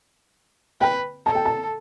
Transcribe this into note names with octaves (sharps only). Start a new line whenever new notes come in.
B4 G5
A4 A5
G5
A5